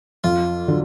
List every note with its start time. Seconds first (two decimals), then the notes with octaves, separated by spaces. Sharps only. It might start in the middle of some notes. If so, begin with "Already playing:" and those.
0.24 F2 F4
0.68 D3 F#3